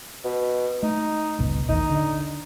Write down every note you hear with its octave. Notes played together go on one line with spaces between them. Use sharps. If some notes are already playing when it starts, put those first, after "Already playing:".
B2
A3 D#4
G1 C#2 B2
A1 D#2 D#3 D#4
D3